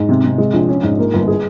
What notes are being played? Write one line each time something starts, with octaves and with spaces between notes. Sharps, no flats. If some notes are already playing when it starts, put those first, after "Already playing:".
Already playing: G#2
C3
C3
G#3
A#1
C#4
G#2
A#3
G1
G#4